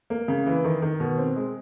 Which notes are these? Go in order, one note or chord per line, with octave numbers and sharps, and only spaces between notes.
A#3
C#3
E3
D#3
D#3
B2
C4
G#3